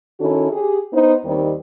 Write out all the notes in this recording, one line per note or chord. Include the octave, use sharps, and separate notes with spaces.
D#3 C#4 E4 F#4 A4
G4 G#4
B3 D#4 C5
D#2 D#3 G3 C4